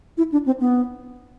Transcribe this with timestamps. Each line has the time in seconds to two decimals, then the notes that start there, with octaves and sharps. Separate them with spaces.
0.18 E4
0.32 D4
0.46 C4
0.60 B3